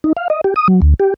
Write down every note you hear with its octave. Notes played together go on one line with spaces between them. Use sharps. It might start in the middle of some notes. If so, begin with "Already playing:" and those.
D#4
F5
D#5
G4
D#6
F#3
D2
G4